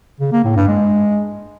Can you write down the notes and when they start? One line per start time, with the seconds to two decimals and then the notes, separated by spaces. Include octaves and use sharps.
0.21 C#3
0.32 A#3
0.44 A2
0.56 G2
0.68 G#3